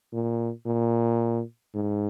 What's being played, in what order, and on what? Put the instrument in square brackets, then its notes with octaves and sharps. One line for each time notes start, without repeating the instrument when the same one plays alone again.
[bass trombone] A#2
A#2
G#2